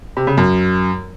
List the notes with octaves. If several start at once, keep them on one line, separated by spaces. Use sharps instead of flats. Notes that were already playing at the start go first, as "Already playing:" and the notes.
C3
C#3
F#2